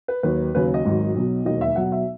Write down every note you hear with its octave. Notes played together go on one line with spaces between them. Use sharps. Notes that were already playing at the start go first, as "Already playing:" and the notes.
B4
D#2 D#3 F#3 B4
D#2 C#3 F#3 B4
D#5
G#1 G#2 D#3 F#3
B1 B2 F#3
E1 D#2 D#3 F#3 D#5
E5
B1 B2 F#3 F#5
E5